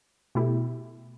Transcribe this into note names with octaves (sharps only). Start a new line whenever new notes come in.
B2 A3 E4 G4